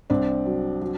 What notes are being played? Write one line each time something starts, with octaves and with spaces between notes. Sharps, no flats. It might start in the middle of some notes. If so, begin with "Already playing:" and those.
C2 C4 D4
F#3
F#3